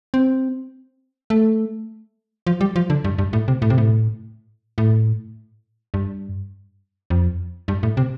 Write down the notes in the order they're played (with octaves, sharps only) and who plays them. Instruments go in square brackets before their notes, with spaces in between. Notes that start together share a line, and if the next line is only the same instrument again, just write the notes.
[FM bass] C4
A3
F3
G3
F3
D3
G2
G2
A2
C3
A2
C3
A2
A2
G2
F2
G2
A2
C3